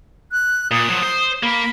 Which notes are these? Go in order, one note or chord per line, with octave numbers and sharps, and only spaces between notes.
F#6
A#2 D#6
F3 F#3
C5
A#3 B5